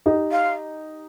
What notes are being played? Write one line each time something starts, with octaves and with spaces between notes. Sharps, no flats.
D#4 G4
F5